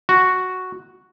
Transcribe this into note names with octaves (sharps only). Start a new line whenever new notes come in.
F#4